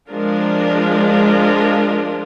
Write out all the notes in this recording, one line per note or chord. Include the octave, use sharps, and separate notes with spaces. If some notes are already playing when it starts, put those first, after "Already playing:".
F3 G#3 D4 F4 A#4